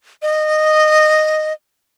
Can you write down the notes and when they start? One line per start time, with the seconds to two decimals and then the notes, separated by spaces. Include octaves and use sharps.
0.22 D#5